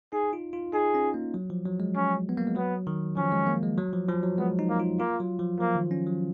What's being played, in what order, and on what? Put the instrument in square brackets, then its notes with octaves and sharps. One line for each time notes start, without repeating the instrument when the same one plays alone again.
[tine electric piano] D#4 [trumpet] G#4
[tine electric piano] F4
F4
[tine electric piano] D#4 [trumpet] G#4
[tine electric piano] C#4
A#3
F#3
F3
F#3
G#3
[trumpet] C#4
[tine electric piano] B3
A#3
G#3
[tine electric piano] F#3 [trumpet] B3
[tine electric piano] D#3
[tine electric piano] F3 [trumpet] C#4
[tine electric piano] G#3
A#3
G#3
F#3
F3
F3
F#3
[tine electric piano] G#3 [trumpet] B3
[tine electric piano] D#4
[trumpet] A#3
[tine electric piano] F4
[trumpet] A#3 [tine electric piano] F4
[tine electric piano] F#3
F3
[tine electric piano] F3 [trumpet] A#3
[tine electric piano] D#3
C#4
F#3